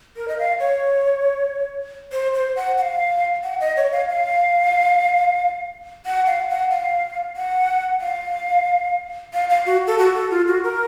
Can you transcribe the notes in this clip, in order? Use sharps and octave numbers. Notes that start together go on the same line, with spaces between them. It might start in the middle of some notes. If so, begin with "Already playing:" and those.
A#4
D#5
F5
C#5
C5
C5
F#5
F#5
F5
F#5
D#5
C#5
F5
F5
F#5
F5
F#5
F5
F#5
F5
F5
F5
F#4
A4
F#4
A4
F4
F#4
A#4